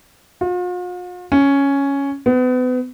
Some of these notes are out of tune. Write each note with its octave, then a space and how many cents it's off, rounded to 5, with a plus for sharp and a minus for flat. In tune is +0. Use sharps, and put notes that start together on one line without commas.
F4 +45
C#4 +5
B3 +35